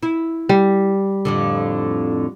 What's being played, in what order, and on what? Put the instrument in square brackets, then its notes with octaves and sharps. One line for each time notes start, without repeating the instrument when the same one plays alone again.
[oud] E4
[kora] G3
[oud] F2 A2 D3